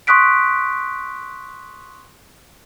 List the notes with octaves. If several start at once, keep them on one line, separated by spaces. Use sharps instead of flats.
C6 C#6 D#6 F#6 B6 D7